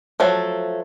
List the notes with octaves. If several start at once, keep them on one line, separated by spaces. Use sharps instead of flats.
F3 F#3 A3